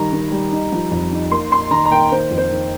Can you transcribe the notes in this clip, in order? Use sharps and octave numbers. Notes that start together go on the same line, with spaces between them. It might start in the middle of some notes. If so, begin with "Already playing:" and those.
Already playing: D#3 G3 A#5
D#3
G3
D#4
F3
F2
D#4
A#3 C6
A#3 C6
D#3 A#5
A#5
A#3 G5
D#3 C5
F2
C5
D#3